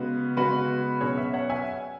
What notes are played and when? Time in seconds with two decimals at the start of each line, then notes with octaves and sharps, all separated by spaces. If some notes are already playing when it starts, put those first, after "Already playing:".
Already playing: C#3 G#3 B3 F#4
0.37 C#3 G#3 B3 F#4 B4
1.01 B2 F#3 C#4 G#4 C#5
1.17 B4 E5
1.33 C#5 F#5
1.50 E5 G#5